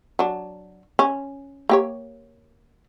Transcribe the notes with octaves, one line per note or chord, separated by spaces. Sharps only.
F#3 D4
C#4
A#3 G4 C#5